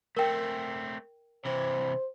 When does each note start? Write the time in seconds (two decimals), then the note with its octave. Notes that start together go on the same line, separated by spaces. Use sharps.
0.17 A3 C4 A#4 G5
1.45 C3 E3 C5